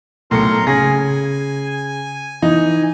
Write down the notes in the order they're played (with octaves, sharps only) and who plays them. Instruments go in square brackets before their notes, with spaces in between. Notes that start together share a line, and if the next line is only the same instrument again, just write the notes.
[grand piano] B1 C#7 [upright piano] A2 [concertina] A#4 A#5 C6
[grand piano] C#3 [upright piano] G#4 A#6 [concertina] G#5
[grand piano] E3 [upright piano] D#4